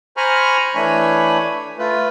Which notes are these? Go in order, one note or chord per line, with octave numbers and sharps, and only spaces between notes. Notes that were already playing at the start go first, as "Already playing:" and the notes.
C5 G#5 A#5 B5 C#6 F6
E3 A3 D4 C#5 G#5 B5
A3 F4 B4